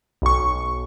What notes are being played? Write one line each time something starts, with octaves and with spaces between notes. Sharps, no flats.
B1 C#6